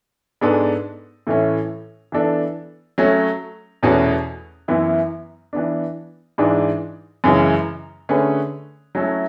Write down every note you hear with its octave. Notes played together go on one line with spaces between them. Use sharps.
G#2 G#3 B3 D4 A4
A2 E3 A3 C#4
E3 B3 D4 A4
F#3 A3 C#4
E2 B2 A3 C#4 F#4
F#2 E3 B3 E4
E3 B3 D4
G#2 E3 G#3 D4
F#2 C#3 E3 G#3 C#4
D3 A3 C#4 G#4 B4
F#3 A3 C#4 E4 A4